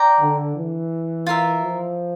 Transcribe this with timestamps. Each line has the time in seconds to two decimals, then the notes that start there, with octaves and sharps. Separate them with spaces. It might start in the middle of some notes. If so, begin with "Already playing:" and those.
Already playing: D5 G5 A#5
0.20 D3
0.55 E3
1.27 F4 A#4 E5
1.62 F3